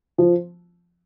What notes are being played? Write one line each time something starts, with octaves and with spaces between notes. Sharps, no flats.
F3